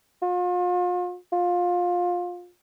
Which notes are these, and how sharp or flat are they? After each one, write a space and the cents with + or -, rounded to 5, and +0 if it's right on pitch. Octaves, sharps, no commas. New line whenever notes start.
F4 +40
F4 +20